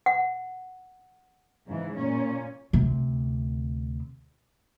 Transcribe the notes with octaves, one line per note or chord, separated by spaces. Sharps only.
F#5
G#2 C#3 E3
A#2 C#4
D2 C3